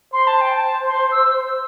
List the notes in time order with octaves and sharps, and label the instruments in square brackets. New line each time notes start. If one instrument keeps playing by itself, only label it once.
[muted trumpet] C5 [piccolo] C6
[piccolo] A5
G5
A5
C6
E6